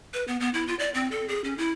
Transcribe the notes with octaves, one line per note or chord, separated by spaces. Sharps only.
B4
B3
B3
E4
F4
D5
C4
A4
G#4
C#4
E4